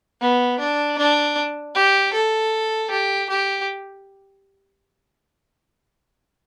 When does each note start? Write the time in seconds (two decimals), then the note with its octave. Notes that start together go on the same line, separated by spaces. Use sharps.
0.21 B3
0.59 D4
0.98 D4
1.75 G4
2.14 A4
2.90 G4
3.29 G4